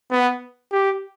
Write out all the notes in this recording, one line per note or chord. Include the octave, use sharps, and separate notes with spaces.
B3
G4